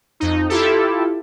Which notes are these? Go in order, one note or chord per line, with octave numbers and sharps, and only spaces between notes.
F2 D#4
E4 F4 G4 A4